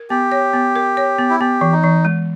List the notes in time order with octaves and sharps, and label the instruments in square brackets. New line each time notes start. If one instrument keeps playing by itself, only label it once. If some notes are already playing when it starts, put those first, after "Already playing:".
Already playing: [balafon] A#4
[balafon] B3 [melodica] G4
[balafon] C#5
B3
A#4
C#5
B3
[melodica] E4
[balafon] B3 [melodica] G4
[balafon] E3
[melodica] D#4
[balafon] E3
G#3